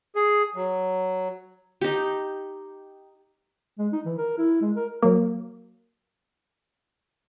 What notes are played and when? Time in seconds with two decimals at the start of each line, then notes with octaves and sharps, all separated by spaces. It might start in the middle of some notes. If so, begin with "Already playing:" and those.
0.16 G#4
0.55 F#3
1.81 D#4 G4
3.79 G#3
3.92 D#4
4.05 E3
4.18 A#4
4.38 E4
4.61 G#3
4.76 A#4
5.02 F#3 A#3